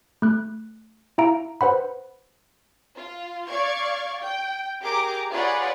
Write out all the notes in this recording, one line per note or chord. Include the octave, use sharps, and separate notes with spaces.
A3 F#6
E4 E5 F5 A#5 D7
B4 C5 F#5 B5
F4
D5 F5 C#6 G#6
G5
G4 G#4 A#4 A#5 D6
F4 G#4 B4 C#5 D5 F#5